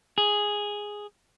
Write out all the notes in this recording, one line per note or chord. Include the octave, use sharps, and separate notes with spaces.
G#4